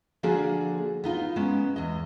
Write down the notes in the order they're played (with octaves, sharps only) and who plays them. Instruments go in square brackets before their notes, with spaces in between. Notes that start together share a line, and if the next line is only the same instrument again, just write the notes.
[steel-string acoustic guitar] D3 F3 A#3 D4 F#4 G#4
B3 D#4 F4
G#3 A#3 B3 C#4
E2 D#5